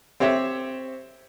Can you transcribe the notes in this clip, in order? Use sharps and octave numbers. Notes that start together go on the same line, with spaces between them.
C4 G4 C#5 E5